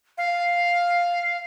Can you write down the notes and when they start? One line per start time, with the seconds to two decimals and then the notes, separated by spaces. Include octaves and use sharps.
0.18 F5